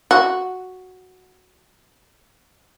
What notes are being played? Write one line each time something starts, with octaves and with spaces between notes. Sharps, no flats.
F#4